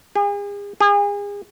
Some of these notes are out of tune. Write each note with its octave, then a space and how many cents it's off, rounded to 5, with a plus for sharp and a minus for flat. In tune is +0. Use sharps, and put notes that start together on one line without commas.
G#4 -40
G#4 -35